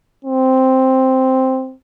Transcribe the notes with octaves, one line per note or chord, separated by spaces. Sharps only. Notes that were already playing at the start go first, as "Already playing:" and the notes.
C4